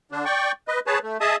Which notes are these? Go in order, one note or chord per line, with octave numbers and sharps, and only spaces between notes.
D3 D4
D5 G5 C#6
B4 D#5
G#4 B4 C#5 A5
A3
G#4 D#5 E5 A5 D#6